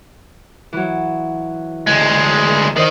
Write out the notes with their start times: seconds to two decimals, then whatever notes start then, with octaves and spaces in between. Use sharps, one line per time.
0.73 E3 F#3
1.87 D2 G#3
2.76 D#3 C5 D#5